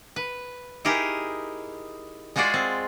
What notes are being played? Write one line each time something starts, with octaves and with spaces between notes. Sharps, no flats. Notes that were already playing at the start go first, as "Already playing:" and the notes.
B4
D#4 E4 G4 G#4 A#4
G#3 F4 F#4 G#4 D5
C4